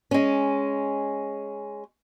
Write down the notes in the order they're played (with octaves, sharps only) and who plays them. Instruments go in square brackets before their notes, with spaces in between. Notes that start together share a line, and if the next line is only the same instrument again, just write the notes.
[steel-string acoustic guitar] G#3 C#4